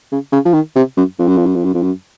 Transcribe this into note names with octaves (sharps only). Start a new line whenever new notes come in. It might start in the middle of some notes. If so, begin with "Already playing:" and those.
C#3
C#3
F3
D#3
C3
F#2
F2
F#2
F2
F#2
F2
F#2
F2
F#2